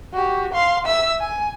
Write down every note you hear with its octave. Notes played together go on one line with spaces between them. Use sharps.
F#4 G4
F5 C6
E5 E6
G#5